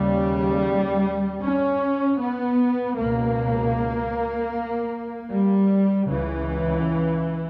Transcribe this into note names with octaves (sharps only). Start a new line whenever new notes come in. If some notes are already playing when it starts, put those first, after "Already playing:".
Already playing: D#2 C#3 G3
C#4
B3
C#2 B2 A#3
G3
C#2 C#3 E3